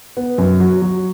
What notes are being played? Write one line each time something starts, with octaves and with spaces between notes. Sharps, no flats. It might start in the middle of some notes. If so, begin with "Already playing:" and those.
B3
F#2
F#3
F#3